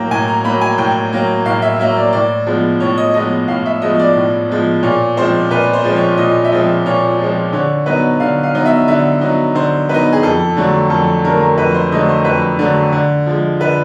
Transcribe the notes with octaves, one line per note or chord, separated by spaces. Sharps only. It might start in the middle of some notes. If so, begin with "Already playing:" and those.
Already playing: A2 F#3 A#3 G5
A2 G#5
A#5
F#3 A#3 B5
G#5
A2 G5
F#3 A#3
A2 F5
E5
F#3 A#3 E5
D5
A2 D5
F3 G#3 B3
A2 C#5
D#5
F3 G#3 B3 D#5
A2 F5
E5
F3 G#3 B3 D#5
D5
A2
F3 G#3 B3
A#2 C#5
F3 G#3 C4 C5
A#2 B4
C5
F3 G#3 C4
C#5
A#2 D#5
E5
F3 G#3 C4 D#5
A#2 C#5
F3 G#3 C4
D3 C#5
F#3 B3 D#4 B4
D3 F5
F5
F#3 B3 D#4
E5
D3 E5
F#3 B3 D#4
D3 C5
F#3 B3 D#4 B4
G#4
F2 A4
D3 F#3 A3
F2 A4
D3 F#3 A3 A#4
A#4
F2 B4
C5
D3 F#3 A3 D#5
C5
F2 B4
D3 F#3 A3
D3
F3 G#3
D3 B4